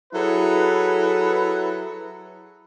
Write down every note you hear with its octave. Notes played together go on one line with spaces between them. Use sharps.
F#3 E4 G#4 A4 B4